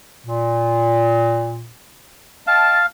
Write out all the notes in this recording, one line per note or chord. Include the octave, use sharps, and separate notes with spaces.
A#2
D#5 F5 G5 A5